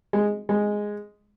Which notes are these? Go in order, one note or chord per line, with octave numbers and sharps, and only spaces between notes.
G#3
G#3